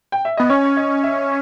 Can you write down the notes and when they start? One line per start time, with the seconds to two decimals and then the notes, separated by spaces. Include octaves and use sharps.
0.12 G5
0.25 E5
0.37 B3 D#5
0.50 C#4 C#5
0.77 D#5
1.04 E5